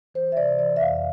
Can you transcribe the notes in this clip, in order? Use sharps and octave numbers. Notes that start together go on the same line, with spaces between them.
E3 C5
E5
C3 D5
E3 D5
E5
F2 F5